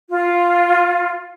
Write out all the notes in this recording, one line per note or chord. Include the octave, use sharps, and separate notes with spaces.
F4